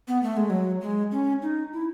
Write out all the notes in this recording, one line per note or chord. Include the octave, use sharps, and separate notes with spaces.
B3
A3
G#3
F#3
G#3
C#4
D#4
E4